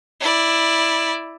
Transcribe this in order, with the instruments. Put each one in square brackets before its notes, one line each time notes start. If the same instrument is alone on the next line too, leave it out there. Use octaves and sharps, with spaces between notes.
[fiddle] E4 D5